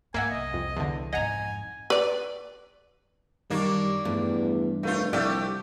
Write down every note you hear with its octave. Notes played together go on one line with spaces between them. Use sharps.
G#2 A#3 E5 F#5 G#5
C2 D#5
F2
E2 D3
F2 G#2 D#5 F#5 G#5 A#5
B4 D5
F#2 D#3 G3 A#3 D4 C#6
E2 G2 F3 A3
F1 A3 F4 A#4 B4 F5
C2 F3 A3 G4 D5 E5 F#5 F#6